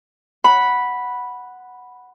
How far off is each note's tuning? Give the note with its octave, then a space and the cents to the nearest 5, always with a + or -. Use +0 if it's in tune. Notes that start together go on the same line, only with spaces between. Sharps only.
F#5 +0 B5 -5